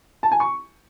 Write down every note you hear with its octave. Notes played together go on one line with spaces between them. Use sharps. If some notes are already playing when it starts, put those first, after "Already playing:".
A5
G#5
C#6